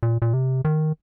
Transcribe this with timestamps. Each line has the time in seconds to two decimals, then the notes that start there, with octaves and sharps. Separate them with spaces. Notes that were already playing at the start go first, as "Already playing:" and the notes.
0.03 A#2
0.22 A#2
0.33 C3
0.65 D#3